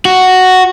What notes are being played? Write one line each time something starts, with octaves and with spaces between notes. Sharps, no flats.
F#4